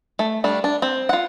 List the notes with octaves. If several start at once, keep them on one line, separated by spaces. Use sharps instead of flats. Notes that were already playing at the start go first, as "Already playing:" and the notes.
A3
G3 A3 D4
D4
C4
F4 F#5